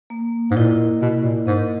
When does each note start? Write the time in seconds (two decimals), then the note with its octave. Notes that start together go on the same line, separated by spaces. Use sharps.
0.10 A#3
0.51 G#2
0.56 A#2 E4 A#4 D#5
1.01 B2 A#3
1.24 A#2
1.47 G#2 E4 A#4 D#5